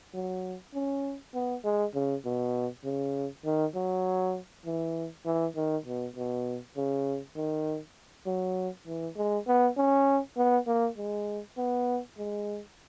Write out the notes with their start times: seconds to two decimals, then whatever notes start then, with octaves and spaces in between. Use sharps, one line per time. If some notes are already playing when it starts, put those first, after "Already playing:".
0.14 F#3
0.74 C#4
1.34 B3
1.64 G#3
1.94 C#3
2.25 B2
2.84 C#3
3.45 D#3
3.75 F#3
4.66 E3
5.26 E3
5.56 D#3
5.86 B2
6.16 B2
6.77 C#3
7.36 D#3
8.26 F#3
8.87 E3
9.17 G#3
9.47 B3
9.77 C#4
10.37 B3
10.67 A#3
10.98 G#3
11.58 B3
12.18 G#3